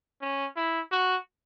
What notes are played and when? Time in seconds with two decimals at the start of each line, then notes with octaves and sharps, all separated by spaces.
0.21 C#4
0.56 E4
0.91 F#4